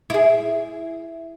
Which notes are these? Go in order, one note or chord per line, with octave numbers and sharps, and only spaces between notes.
E4 G#4